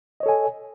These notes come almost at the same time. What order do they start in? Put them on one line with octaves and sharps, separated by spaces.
D#5 C#5 A4 G#5